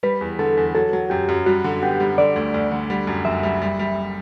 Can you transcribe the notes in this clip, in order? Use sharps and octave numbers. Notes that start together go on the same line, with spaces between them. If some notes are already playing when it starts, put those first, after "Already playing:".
G3 B4
E2
D3 A4
E2
F#3 A4
F#3
F#2 G4
F#2
G3 F#4
D3
B3 G4
G3
D3 D5
D2
D2
D3
G3
F#2
F#1 E5
G3
G3
G3